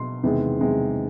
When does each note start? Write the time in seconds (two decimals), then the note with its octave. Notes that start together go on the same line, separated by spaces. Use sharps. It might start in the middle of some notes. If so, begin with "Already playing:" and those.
Already playing: B2 C6
0.23 E2 C3 D#3 G#3
0.61 E2 C3 D#3 G#3